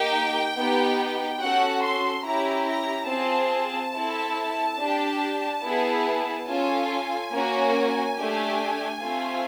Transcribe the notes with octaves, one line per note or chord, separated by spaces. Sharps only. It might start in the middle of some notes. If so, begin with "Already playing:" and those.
Already playing: A#3 D#4 G4 G5
B3 D#4 G4
C#4 F#4 A4 F#5
C6
C#4 E4 G4 A#5
A#5
C4 F4 G#4 A5
C4 E4 A4
D4 G4
B3 E4 G#4
C#4 F4 A4 G#5
A#3 C#4 F#4
A3 D4 G4
A3 C4 F4